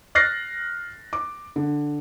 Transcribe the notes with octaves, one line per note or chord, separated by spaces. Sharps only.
F6 F#6 A6 A#6 C7
D6
D3